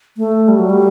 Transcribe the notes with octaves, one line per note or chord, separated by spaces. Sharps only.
A3
G3
F#3
G3